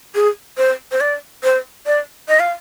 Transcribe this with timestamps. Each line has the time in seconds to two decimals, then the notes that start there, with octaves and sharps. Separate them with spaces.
0.15 G#4
0.58 C5
0.92 C5
1.01 D5
1.43 C5
1.86 D5
2.29 D#5
2.40 F5